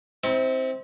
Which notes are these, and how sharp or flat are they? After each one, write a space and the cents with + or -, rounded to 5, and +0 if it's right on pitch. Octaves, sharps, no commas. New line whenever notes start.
C4 +0 E4 -40